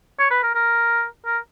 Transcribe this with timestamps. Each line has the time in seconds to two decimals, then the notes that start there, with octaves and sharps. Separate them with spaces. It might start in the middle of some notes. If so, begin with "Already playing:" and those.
0.19 C#5
0.31 B4
0.43 A#4
0.55 A#4
1.26 A#4